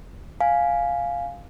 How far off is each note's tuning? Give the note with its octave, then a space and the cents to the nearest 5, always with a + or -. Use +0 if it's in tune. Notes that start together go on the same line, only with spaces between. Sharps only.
F5 +0 G#5 +0